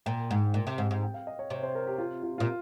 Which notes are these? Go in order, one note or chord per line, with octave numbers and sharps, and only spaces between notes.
A#2 G5
G#2
A#2
C3
G#2
G#2
G5
F5
D#5
C#5
C3 C#5
C5
A#4
G4
F4
F4
A#2 F4